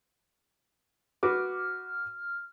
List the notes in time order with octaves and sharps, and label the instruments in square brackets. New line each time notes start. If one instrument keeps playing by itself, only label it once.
[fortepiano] F#4 B4 D6 [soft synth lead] F6